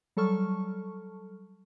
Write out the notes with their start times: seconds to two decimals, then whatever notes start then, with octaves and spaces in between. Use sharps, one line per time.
0.17 F#3 G3 A4 A5 C#6 F6